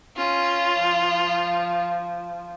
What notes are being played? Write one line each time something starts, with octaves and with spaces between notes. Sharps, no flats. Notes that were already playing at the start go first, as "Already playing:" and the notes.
C#4 F4
F3